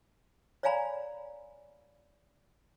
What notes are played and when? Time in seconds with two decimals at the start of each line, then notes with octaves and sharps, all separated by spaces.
0.63 C#5 D5 F5 G#5 A#5 B5